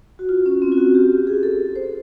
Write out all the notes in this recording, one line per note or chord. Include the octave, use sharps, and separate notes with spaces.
F#4
F4
C#4
C4
F4
F#4
G4
G#4
A4
C5